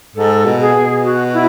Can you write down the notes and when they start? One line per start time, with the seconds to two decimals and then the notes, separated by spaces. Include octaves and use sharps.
0.16 G#2 A4
0.45 B2
0.60 G#4
0.74 B2
1.03 F#4
1.33 E4